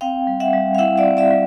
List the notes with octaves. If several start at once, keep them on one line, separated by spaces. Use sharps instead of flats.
C4 F5 G5
G3
E5 F#5
G3
F5
E4 E5 F#5
D5 E5
C4
D5 E5
G3